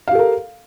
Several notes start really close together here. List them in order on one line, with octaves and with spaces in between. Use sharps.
F5 G4 A4 A#4